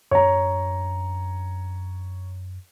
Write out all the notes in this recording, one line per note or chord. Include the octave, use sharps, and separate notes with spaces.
F#2 D4 C#5 A#5